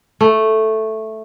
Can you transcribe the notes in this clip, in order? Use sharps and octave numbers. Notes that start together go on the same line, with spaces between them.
A3